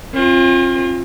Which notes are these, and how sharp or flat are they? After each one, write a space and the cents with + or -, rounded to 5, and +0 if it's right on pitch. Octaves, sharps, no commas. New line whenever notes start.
C4 +45 F4 +0